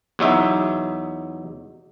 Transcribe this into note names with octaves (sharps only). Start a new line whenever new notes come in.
E2 F#3 D#4 E5